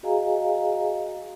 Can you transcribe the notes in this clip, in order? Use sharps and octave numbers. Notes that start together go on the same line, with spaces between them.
F#4 G#4 D#5 F5 G#5 A#5